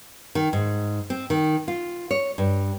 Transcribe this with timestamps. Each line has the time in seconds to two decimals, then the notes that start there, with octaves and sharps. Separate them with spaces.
0.35 D#3
0.53 G#2
1.10 C4
1.30 D#3
1.68 F4
2.11 C#5
2.38 G2